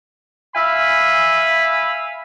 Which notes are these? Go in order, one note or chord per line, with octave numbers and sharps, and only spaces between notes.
E5 F5 G#5 B5